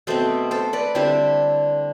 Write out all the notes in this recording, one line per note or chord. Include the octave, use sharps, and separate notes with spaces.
B2 A3 C4 A4 C5
A4 C5
B4 D5
D3 G3 C4 E4 C5 E5